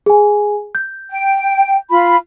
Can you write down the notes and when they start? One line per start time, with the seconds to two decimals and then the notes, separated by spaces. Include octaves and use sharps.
0.06 G#4 G#5
0.75 G6
1.11 G5
1.91 F4 B5